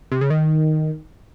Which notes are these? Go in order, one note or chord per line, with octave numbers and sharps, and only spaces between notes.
C3
C#3
D#3